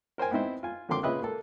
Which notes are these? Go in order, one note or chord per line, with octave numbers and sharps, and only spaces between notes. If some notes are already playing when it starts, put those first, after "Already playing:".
A#4 C5 G5 G#5
B3 C4 D#4 E4 C5
F4 G#5
F2 D3 A#3 C4 C6 D6
A#2 C#3 B4 D#5 E5 F#6
A#3 A4